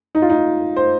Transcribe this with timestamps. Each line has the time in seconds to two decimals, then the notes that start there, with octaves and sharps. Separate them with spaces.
0.15 D#4
0.22 F4
0.30 D#4
0.76 C5